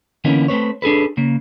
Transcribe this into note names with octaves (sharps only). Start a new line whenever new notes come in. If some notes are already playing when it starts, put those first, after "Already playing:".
D3 E3 A#3 B3 C#4 D#4
A3 C4 B4 C#5
D4 G#4 A4 B4
C#3 A#3